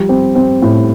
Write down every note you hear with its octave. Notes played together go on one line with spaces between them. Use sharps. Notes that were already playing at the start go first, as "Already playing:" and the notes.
Already playing: F3 G3
C4
C4
A2